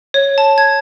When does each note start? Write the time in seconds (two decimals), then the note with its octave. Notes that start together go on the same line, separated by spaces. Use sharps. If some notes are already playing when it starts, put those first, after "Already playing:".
0.14 C#5
0.38 A5
0.58 G#6